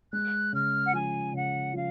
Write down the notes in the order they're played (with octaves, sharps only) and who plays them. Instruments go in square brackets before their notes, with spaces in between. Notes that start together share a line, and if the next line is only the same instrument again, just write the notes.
[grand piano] G#3 [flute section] F#6
[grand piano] C#3 [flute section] F6
[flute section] F#5
[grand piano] F3 [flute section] G#5
[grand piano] C#3 [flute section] F#5
[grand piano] F3 [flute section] F5